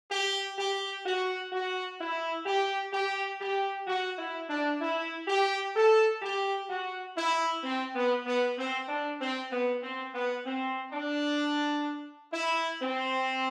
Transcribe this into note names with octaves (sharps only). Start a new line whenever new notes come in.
G4
G4
F#4
F#4
E4
G4
G4
G4
F#4
E4
D4
E4
G4
A4
G4
F#4
E4
C4
B3
B3
C4
D4
C4
B3
C4
B3
C4
D4
E4
C4